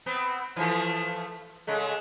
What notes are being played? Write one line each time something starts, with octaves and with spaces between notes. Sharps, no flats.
B3 C4
E3 F3 A3
C#3 G#3 A3